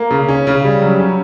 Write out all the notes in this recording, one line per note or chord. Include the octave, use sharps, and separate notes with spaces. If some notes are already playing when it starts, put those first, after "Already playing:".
Already playing: A#3
C#3
C#4
C#3
G3
F#3
C#4